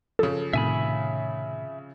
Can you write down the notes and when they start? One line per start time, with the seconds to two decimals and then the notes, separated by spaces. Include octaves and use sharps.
0.19 C#3 F3 A4
0.53 A2 C3 D#3 E5 G#5 B5